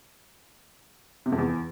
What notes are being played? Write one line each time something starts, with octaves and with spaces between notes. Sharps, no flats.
C3
F2
E2